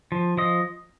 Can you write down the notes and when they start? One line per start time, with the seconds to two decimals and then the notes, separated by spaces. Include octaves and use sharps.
0.12 F3
0.37 F3 D#5